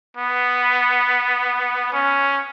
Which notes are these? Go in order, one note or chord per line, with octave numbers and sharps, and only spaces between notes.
B3
C#4